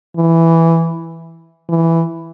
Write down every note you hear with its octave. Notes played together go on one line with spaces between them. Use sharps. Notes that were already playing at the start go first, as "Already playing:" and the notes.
E3
E3